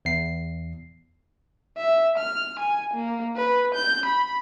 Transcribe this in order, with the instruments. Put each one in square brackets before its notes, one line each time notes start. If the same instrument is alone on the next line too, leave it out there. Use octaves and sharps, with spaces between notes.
[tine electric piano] E2 C7
[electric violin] E5
F6
G#5
A#3
B4
G6
B5